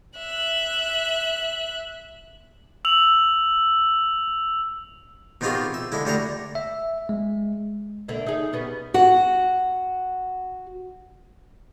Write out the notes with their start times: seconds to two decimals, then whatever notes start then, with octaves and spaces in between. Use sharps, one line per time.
0.19 E5 F#6
2.85 E6 F7 F#7
5.41 B2 D#3 C4 F4 G4 G#4
5.74 E5
5.92 D3 G#3 E4
6.05 D2 G3 D4 D5 F#5 A#5
6.55 E5
7.09 G#3
8.08 D3 A#3 E5
8.27 D#4 G#4
8.53 G3 B3 C#4
8.94 F#4 F#5